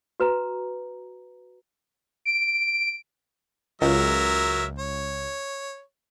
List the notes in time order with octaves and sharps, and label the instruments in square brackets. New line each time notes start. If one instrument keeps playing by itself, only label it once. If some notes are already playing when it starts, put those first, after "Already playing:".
[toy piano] F#4 B4 A#5
[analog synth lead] D7
[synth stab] C#2 [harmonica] F#3 A#4 E5
[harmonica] C#5